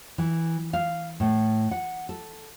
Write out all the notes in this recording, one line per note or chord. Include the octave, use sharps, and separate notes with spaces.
E3
F5
A2
F#5
A4